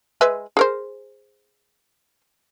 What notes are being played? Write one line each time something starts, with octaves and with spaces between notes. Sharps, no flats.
G#3 B4 E5
G#4 A#4 C5